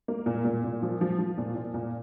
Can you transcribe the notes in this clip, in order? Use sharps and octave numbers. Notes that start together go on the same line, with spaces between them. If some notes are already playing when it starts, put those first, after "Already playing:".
A#3
A#2
A#2
A#2
F3
F3
F3
A#2
A#2
A#2